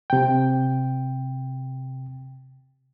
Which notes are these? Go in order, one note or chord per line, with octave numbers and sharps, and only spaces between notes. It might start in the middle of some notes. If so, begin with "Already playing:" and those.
C3 G5